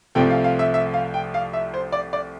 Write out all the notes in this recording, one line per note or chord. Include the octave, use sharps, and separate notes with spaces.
C2 C3 F3 A3 C4 G5
F5
F5
E5
E5
F5
G5
F5
E5
C5
D5
D5